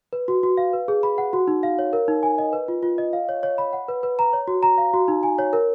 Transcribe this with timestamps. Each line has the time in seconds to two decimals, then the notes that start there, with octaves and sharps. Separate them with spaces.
0.13 B4
0.28 F#4
0.43 F#4
0.57 F5
0.73 B4
0.88 G#4
1.03 B5
1.18 F#5
1.33 F#4
1.48 D#4
1.63 F5
1.79 C#5
1.93 A#4
2.08 D#4
2.23 G#5
2.38 D#5
2.53 B4
2.68 F4
2.83 F4
2.98 D#5
3.13 F5
3.29 C#5
3.43 C#5
3.58 B5
3.73 F#5
3.88 B4
4.03 B4
4.19 A#5
4.33 C#5
4.48 F#4
4.63 A#5
4.78 F5
4.94 F#4
5.08 D#4
5.23 G#5
5.38 C#5
5.53 A#4